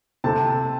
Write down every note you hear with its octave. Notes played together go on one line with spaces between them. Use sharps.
C3 A3 C4 A5